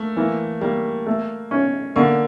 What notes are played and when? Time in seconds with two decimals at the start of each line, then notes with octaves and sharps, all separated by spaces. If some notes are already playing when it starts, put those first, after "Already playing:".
Already playing: A3 A#3
0.16 E3 A#3
0.61 G3 A#3
1.06 A3
1.51 C#4
1.96 D3 A#3